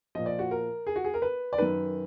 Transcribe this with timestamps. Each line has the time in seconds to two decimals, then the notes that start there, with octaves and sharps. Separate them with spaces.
0.15 A#2 F3 D#5
0.26 D5
0.39 F#4
0.51 A#4
0.87 G#4
0.96 F#4
1.04 G#4
1.14 A#4
1.22 B4
1.53 D5
1.58 F#2 D#3 B4